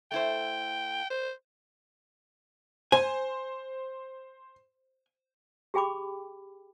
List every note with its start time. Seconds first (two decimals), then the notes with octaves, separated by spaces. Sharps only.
0.11 A3 E4 C5 G5
1.11 C5
2.92 C5 G#5
5.74 G4 G#4 G5 B5 D6